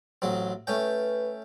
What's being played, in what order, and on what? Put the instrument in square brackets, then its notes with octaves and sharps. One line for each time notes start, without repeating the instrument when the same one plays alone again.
[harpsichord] A1 F#3 C4
[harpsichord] A3 C#4 G5 [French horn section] B4